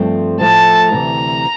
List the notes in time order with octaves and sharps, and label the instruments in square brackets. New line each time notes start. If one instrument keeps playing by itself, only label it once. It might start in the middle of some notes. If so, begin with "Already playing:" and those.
Already playing: [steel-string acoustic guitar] G2 F3 A3 C4
[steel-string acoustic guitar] A2 F3 A3 [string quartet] A5
[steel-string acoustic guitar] D2 C3 E3 [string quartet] A#5